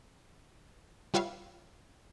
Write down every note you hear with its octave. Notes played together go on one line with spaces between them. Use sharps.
G3 F4 B4 C#5 E5 F5